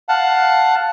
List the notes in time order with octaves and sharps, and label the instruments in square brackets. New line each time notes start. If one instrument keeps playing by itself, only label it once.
[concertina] F5 F#5 A5